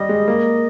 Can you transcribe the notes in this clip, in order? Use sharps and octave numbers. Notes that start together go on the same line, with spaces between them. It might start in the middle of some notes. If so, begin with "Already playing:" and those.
Already playing: G3 D#5
G#3
A#3